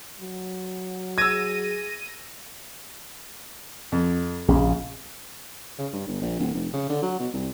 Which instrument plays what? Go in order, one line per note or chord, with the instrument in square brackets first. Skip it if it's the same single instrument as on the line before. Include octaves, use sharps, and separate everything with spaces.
[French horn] F#3
[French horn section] G#4 [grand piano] E6 G#6 [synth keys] A#6 D#7
[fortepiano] F2
[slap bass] A#1 [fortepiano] C#3
[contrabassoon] C#3
G2
G1
A#1
D1
F1
C#3
D3
F#3
B2
C2